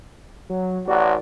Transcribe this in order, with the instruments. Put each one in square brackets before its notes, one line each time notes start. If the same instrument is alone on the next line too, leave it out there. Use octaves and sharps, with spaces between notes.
[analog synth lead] F#3
[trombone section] A1 F#4 [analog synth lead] D5